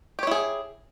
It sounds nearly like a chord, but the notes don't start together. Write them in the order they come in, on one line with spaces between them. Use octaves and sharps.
G4 C#5 E4 G#4